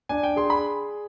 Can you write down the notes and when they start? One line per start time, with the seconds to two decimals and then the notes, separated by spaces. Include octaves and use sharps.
0.09 D4 G#5
0.23 G5
0.36 G#4 C6
0.50 B5